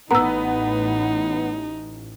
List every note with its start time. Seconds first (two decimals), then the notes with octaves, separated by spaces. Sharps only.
0.11 A1 B3 D#4 A#5 E6